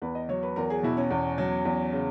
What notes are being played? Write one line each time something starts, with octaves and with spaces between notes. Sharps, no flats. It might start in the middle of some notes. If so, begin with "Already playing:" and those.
E2 B4
D#5
F#3 C#5
B4
E2 A#4
G#4
B2 E4
C#4
E2
F#3
E2
C#3